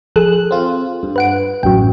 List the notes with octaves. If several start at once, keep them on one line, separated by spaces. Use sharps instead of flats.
F3 G#4 A4 F#6
C4 F4
G2
B4 F#5 D7
A1 F#2 F#3 G5